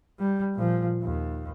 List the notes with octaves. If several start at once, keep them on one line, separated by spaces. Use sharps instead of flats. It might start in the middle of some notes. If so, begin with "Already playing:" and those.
G3
A#2 F3
D#2